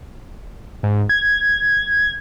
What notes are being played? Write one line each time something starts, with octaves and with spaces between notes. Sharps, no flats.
G#2
G#6